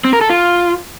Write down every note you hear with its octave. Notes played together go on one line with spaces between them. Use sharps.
C4
A#4
A4
F4